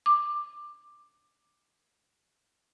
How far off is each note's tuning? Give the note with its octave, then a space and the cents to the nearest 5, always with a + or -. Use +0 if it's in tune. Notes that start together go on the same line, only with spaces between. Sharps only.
D6 +15